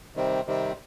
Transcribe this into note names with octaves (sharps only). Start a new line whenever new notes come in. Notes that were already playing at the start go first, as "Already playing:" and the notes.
C3 D#3 G3 C4
C3 D#3 G3 C4